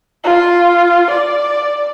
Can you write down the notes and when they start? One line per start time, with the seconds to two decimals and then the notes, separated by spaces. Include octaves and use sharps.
0.24 F4
1.11 D5